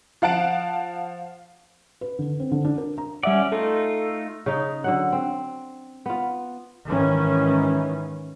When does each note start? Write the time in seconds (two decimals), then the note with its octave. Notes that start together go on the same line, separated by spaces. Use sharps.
0.22 F3 F5 F#5 A5 D7
2.01 B4
2.19 D3
2.40 C4
2.52 D3
2.65 D4
2.78 A#4
2.98 A#5
3.23 G3 C#4 D5 E5 F#5
3.52 A3 D#4 F4 A4
4.46 C#3 D#4
4.84 D3 F#3 F#5
5.12 C4
6.06 B3 F4
6.88 G#2 D#3 E3 C#4